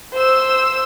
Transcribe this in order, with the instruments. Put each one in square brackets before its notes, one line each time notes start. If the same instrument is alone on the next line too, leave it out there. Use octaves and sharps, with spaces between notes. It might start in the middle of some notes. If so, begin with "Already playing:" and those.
[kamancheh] C5 E6